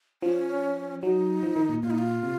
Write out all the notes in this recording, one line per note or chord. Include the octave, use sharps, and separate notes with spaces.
F3 C#4
F#3 D#4
F3
D#3
A#2
A#2 F4
D#4
F4
C3